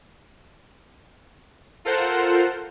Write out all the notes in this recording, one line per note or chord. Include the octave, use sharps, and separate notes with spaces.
F4 A4 A#4 C5 F#5